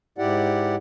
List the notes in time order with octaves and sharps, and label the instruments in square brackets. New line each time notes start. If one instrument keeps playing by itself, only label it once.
[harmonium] G#2 E4 G4 D5 F#5